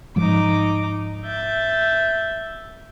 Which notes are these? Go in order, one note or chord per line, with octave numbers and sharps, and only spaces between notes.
G#2 F3 G#3 D#4 D6
E5 G6 A6